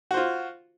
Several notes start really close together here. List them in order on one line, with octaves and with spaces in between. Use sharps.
F#4 C5 F4